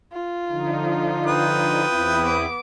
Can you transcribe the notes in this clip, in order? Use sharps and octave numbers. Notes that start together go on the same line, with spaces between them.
F4
D3 F3 D#4
B4 G5 D#6
E2 C4 E4
B3 D6